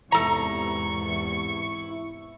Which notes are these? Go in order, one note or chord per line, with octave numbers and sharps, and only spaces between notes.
E2 G#2 C3 E4 A4 A#5 C#6